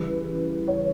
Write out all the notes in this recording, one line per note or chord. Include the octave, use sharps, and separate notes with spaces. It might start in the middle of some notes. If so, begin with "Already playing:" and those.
Already playing: C#3 E3 G3 B4
C#5